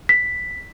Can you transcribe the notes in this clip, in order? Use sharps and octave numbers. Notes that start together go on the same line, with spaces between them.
B6